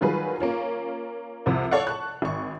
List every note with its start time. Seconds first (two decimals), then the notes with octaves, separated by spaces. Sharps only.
0.01 D#3 F#3 G3 F4 G#4 B4
0.40 A#3 C#4 F4
1.46 C2 F2 C3
1.71 A4 C#5 D5 F5 F#5
1.87 A5 C#6 F#6
2.22 G#1 C#6